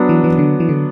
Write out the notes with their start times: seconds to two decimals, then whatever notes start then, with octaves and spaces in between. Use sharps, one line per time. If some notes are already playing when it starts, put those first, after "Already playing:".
Already playing: F#3 B3 D4
0.09 E3
0.24 E3
0.39 D3
0.60 E3
0.69 D3